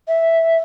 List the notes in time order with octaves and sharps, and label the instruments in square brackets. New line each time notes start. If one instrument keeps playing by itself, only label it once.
[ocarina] E5